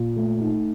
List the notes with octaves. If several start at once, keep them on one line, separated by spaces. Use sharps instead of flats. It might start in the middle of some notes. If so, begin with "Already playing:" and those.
Already playing: A#2
A3
D#4